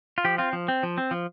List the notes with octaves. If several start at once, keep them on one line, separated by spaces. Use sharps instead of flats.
F4
F3 G4
C4 F4
F3
C4
F3
C4
F3